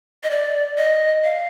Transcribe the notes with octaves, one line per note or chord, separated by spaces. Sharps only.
D#5
D5
D#5
F5